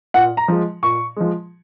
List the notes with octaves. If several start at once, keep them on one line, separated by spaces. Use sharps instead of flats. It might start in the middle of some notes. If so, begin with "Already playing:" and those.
A#2 F#5
A#5
F3 G#3
A#2 C#6
F3 G#3